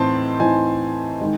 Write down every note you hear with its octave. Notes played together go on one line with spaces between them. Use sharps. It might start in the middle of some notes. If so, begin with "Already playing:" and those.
Already playing: A2 E3 C4 D#4 A5 C6
A2 E3 C4 D#4 G#5
D#3 G#3